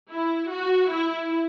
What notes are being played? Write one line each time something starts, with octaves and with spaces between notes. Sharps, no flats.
E4
F#4
E4